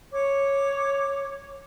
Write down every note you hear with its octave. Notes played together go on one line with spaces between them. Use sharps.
C#5 D6